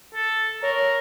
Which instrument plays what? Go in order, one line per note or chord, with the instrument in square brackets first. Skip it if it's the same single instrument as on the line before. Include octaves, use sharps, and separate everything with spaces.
[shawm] A4
[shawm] A#4 [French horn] C#5